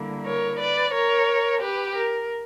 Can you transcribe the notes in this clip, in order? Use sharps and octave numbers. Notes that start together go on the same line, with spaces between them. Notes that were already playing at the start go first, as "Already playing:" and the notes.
Already playing: D3 G3 A#3 E4
A#4 C#5
B4 D5
A#4 C#5
G4 B4
A#4